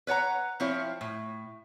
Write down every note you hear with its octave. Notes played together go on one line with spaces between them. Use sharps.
B4 C#5 F#5 A#5
F3 C4 E4 F4 C#5
A2